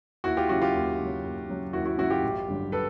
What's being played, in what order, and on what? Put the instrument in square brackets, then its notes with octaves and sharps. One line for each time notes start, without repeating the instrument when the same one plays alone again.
[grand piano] D#2 E4 F#4
F4 G4
C#3 F#3 E4 F#4
F4 G4
D#2
C#3 F#3
D#2
C#3 F#3
D#2 E4 F#4
E4 F#4
C#3 F#3 E4 F#4
F4 G4
A1
G2 D3 F#3
A4 B4